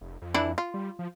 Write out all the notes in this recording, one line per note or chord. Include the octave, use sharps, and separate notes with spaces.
F1
F2
E3 D4 E4
F4
G3
F3